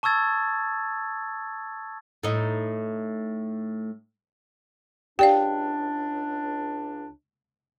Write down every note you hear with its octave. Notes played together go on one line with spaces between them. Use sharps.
A5 C#6 D#6 E6 G#6 A6
A2 D#4
C#2 D4 G4 D5 F5 G5